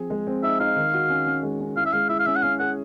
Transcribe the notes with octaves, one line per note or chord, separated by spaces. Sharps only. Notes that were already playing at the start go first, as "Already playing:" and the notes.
Already playing: F3 C4 G#4
G#3
C4
D#4 E5
D#4 F5
D#3
F#4
C#4
C#4
G#3
C#4
E4 F5
E5
G#3 F5
E4 E5
F5
C#4 E5
F#5
C#4 F5
G#4 F#5